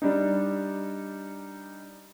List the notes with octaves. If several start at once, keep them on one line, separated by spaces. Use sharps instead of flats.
G3 D4 D#4